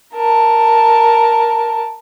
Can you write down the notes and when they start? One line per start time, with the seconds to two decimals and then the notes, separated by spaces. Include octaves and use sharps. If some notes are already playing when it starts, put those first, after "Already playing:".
0.14 A#4 A5